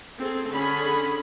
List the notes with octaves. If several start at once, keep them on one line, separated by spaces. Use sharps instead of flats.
C4 G#4 A4
D3 C#4 G#4 B5